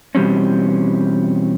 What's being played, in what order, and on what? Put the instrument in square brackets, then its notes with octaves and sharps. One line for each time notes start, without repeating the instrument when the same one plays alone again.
[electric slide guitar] B2 E3 G3 C4 C#4